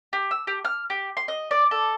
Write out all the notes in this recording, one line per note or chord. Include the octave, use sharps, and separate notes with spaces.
G4
E6
G4
F6
G4
C6
D#5
D5
A4